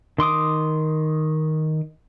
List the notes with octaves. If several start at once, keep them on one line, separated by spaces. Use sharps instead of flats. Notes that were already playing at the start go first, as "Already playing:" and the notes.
D#3 C6 D6 D#6